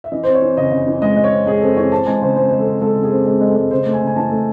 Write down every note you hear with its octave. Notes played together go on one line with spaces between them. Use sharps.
E5
E3 D#5
C4 C5
C#5
E3
C#3 D#5
C#3
E3
G#3 D#5
G#3
C#5
C4
G#3 G#4
C4 A4
E3 C#5
C4 A5
G#3 G#5
C#3 C5
G#3 C5
G#3 C5
A4
C4
G#3 A4
C#3
G#4
C4
G#3 G#4
G#3
A4
G#3
C#3 C5
A3
G#5
C#3
G#5
E3 A5
A3